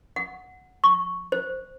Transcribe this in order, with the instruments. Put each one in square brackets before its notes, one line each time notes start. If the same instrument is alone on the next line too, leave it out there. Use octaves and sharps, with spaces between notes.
[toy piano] F#5
C#6
C5